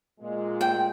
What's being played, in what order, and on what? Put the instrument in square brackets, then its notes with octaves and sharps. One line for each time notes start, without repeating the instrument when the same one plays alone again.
[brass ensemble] A#2 G#3
[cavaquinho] G5